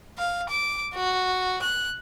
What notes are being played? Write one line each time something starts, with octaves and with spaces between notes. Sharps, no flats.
F5
D6
F#4
F#6